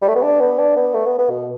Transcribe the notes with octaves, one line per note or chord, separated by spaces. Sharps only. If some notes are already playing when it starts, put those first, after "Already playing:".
G3
A3
B3
D4
B3
D4
B3
A3
B3
B3
B2